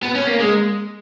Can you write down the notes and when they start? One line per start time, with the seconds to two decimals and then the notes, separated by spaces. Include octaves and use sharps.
0.03 B3
0.15 C#4
0.27 A#3
0.40 G#3